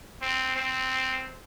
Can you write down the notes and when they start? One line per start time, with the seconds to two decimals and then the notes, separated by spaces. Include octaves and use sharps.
0.22 C4
0.56 C4